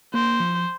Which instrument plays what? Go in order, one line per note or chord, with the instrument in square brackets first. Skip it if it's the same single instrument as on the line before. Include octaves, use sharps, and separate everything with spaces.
[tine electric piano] A#3 [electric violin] C5
[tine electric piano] F3